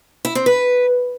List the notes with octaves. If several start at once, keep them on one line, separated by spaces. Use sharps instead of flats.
E4
C4
B4